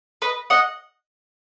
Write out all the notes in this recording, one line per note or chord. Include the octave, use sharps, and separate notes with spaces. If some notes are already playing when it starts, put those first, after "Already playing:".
B4 D#5
D#5 F#5